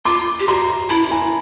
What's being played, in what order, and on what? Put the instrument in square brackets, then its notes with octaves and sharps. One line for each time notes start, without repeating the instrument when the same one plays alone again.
[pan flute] F4 [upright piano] C6 D6
[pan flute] G4
[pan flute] F#4 [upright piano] A#5 C6
[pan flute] E4 [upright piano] A5 B5
[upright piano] G#5 A#5